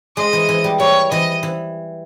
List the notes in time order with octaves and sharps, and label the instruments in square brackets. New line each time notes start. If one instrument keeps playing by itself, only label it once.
[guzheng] G#3 [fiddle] D#5
[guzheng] E3
E3
G3
[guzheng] G3 [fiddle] C#5
[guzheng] E3 [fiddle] D#5
[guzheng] E3